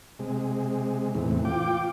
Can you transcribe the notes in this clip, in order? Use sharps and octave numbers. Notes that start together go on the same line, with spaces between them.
C3 G#3
E2 A2 C3 E3
F4 G5 D6